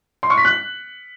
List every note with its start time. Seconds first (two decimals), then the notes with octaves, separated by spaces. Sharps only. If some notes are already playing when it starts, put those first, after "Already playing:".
0.23 C6
0.30 C#6
0.37 B6
0.45 F#6